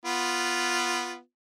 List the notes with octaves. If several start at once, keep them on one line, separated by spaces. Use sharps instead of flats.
B3 F4